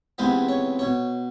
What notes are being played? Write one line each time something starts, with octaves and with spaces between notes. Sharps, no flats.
C#2 C3 E3 G#3 B3 C5
C#5
B2 C#5